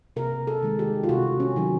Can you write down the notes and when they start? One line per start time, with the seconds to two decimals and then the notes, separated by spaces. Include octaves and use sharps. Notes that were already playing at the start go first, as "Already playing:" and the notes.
0.16 C3 A#4
0.47 A4
0.63 D#3 G#3
0.79 G4
1.04 F4
1.09 C3 F#4
1.40 C#4
1.56 D#3 F#3